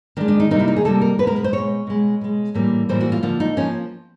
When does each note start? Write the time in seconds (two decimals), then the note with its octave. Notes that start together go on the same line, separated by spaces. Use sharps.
0.17 D#3 D4
0.21 G#3
0.28 D4
0.40 D#4
0.51 C3 D#3 G3 A#3 D#4
0.59 E4
0.68 D#4
0.76 G#4
0.84 C3 D#3 G3 A#3 A4
1.02 A#4
1.18 B2 B4
1.23 G#3 A#4
1.36 B4
1.44 C5
1.53 B2 G#3 C#5
1.87 B2 G#3
2.21 B2 G#3
2.55 A2 E3 G3 A#3
2.89 A2 E3 G3 A#3 C5
3.01 F#4
3.12 F4
3.23 D3 F3 A#3 F4
3.40 D#4
3.57 F3 A#3 C#4